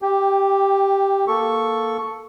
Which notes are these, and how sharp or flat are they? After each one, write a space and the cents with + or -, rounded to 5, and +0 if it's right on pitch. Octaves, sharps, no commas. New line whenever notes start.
G4 +0 G5 +20
A#3 +0 A4 +0 C#6 +0